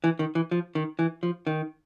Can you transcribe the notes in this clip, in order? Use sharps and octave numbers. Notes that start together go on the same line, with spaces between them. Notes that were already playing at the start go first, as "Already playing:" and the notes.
E3
D#3
E3
F3
D#3
E3
F3
D#3